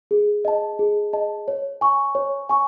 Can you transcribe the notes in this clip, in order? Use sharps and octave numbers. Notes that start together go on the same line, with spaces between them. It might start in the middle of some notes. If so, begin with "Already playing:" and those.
G#4
D#5 A5
G#4
D#5 A5
C#5
G#5 C#6
C#5
G#5 C#6